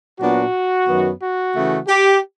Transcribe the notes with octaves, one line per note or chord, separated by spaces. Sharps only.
A#2 F#3 B3 D4 F#4
F#2 D#3 F#3 B3
F#4
C#3 E3 A3
G4